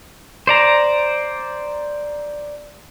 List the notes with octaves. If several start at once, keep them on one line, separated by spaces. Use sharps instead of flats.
C5 D5 A#5